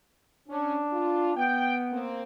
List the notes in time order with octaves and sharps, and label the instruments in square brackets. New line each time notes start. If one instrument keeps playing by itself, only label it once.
[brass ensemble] C#4 [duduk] D4
[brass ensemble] F4
[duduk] B3 [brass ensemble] G5
[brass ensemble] A#3 C4